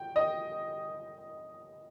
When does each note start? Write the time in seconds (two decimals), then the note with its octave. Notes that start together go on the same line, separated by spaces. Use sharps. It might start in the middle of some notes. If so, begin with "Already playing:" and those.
Already playing: G5
0.16 D#5